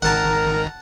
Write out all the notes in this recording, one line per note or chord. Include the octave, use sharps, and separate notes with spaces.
G#1 D#3 A#4 F#5 A5 A#5